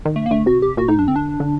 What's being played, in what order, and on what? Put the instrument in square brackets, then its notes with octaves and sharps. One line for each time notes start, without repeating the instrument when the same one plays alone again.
[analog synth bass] D#3
[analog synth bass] D3 [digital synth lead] A3
[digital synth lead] A#3
[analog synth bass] D3 [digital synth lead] A3
[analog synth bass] C3 [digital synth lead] F#4
[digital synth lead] G4
[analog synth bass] A#2 [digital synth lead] F#4
[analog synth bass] A2 [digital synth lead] D#4
[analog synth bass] F#2 [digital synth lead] D4
[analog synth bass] D3 [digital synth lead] C4
[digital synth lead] D4
[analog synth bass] D3